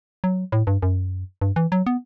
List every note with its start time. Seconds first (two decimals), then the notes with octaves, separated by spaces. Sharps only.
0.24 F#3
0.52 A2
0.67 G2
0.82 F#2
1.42 G2
1.56 E3
1.72 F#3
1.86 B3